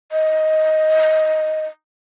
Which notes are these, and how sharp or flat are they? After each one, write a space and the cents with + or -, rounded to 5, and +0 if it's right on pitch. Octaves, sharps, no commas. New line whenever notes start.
D#5 +10